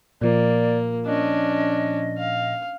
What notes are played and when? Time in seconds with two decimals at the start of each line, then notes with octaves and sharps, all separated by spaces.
0.22 A#2 F3 A#3 D5
1.06 C#4 D4 D#5
2.18 F5